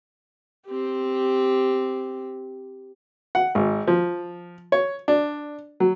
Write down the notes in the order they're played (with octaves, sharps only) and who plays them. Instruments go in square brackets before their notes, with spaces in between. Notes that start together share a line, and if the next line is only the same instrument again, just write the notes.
[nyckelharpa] C4 G4
[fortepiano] F#5
G#1
F3
C#5
D4
F#3